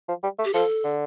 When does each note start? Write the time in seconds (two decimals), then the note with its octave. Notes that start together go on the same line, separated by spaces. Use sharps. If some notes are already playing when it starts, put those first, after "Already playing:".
0.08 F3
0.23 G3
0.39 A3
0.45 G4
0.54 F3 A4
0.84 D3